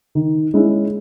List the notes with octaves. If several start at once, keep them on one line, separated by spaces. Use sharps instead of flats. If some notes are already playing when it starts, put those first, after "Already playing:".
D#3
G#3 C#4 E4